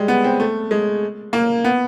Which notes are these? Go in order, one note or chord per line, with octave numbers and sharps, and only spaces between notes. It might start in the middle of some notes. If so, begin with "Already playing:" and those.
Already playing: G3 G#3
B3
C4
A3
G#3
A#3
B3